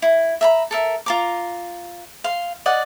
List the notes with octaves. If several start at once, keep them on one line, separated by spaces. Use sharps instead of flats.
E4
E5 A#5 B5
A4 A#4 E5
F4 A#5 D6
F5 C6
D5 D#5 F#5